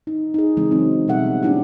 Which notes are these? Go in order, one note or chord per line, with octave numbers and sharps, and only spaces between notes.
D#4
D#4 G#4
C#3 E3 G#3 C4
F#3 C4 D#4
B2 G3 A4 E5 F#5
A3 C#4 D4 E4 G4